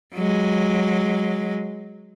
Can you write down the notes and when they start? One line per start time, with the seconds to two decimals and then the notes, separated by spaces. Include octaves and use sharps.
0.15 F#3 G#3